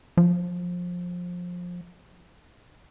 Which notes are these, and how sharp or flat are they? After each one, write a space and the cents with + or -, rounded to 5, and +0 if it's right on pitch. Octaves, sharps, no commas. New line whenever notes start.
F3 +20